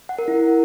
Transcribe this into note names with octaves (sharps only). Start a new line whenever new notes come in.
F#5
A#4
E4